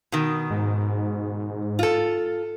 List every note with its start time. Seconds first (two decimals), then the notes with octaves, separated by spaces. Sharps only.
0.12 B2 D#3
0.51 G#2
1.79 F4 A4